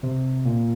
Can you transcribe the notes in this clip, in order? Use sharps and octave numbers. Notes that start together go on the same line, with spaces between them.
C3
A#2